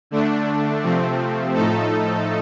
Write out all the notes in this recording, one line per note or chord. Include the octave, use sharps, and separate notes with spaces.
D3 A3 D4
C3 F3 A3 C4
A2 F3 A3 D#4 A4